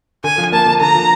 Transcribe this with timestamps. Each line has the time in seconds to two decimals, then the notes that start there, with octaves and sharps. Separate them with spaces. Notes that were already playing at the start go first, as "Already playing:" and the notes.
0.24 D3 G#5
0.38 F3
0.52 A#3 A5
0.66 D3
0.80 D3 A#5
0.95 F3